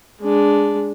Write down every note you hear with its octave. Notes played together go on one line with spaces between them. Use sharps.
G#3 D4